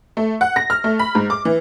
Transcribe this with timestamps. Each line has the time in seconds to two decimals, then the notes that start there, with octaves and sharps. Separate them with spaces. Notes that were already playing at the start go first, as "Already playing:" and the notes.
0.17 A3
0.41 F#5
0.56 A#6
0.70 F6
0.84 A3
0.99 B5
1.15 G#2
1.30 D6
1.45 E3